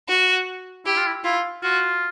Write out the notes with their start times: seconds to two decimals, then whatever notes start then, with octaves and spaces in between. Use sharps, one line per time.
0.09 F#4
0.86 E4 G4
0.97 F4
1.07 E4
1.24 E4 F4
1.63 F4 F#4